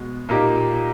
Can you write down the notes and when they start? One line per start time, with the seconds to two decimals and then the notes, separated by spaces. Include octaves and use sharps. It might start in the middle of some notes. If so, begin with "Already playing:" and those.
Already playing: B2 G#3 B3
0.29 A#2 A#3 D#4 G4